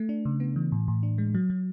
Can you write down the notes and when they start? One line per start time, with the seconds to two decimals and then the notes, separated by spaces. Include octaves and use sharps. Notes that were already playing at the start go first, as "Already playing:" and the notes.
Already playing: A3
0.09 D4
0.25 C#3
0.40 B3
0.56 E3
0.72 A2
0.88 A2
1.03 D4
1.18 G#3
1.35 F#3
1.50 F#3